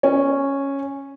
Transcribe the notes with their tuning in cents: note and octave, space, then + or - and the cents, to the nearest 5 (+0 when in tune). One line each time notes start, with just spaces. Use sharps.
C#4 -5